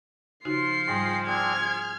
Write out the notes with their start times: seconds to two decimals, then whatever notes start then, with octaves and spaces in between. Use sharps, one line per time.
0.45 C#3 F3 D#4 F4 F#4 C7
0.88 G#2 G3 G#4 D#5 G5
1.26 C4 D4 G#4 F6 G#6
1.60 G#4